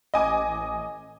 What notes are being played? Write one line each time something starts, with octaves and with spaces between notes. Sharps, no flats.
A1 D#5 G#5 D6